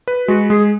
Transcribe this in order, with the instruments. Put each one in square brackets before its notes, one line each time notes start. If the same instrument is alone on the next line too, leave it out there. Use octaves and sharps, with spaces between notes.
[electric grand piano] B4
[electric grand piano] G#3 [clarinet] F#4
[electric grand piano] G#3 [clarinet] G#4